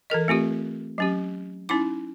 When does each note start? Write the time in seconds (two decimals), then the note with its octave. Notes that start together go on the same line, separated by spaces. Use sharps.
0.10 E3 A4 A#4 D#5
0.28 A3 C4 F4 G4
0.98 F#3 C#4 G4
1.69 C#4 D#4 E4 D6